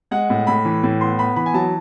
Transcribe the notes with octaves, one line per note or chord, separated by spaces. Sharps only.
G#3 F#5
A2
A2 B5
E3
A2
B3 C6
B3 B5
E3 B5
G#5
F#3 A5